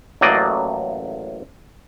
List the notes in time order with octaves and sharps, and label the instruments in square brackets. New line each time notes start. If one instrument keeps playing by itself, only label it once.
[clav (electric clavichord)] A1 A2 F#3 A#3 D5 D#5